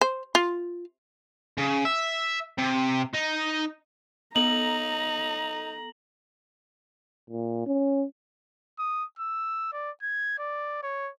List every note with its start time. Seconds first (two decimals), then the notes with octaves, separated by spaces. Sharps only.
0.01 C5
0.35 F4
1.58 C#3
1.85 E5
2.58 C3
3.14 D#4
4.36 B3 D#4 A4 A#5 F#7
7.30 A#2
7.66 C#4
8.79 D#6
9.19 E6
9.73 D5
10.02 G#6
10.39 D5
10.83 C#5